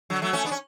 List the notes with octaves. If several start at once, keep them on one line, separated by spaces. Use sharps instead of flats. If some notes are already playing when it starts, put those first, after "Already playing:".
D3 F#3
F#3 A3
A3 C#4
B3 D4
C#4